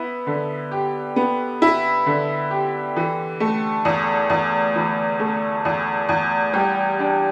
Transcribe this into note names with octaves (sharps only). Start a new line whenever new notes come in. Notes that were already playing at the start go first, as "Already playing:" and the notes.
Already playing: B3 E4
D3
G4
B3
E4
D3
G4
E3
A3
E2
E2
E3
A3
E2
E2
G3
D4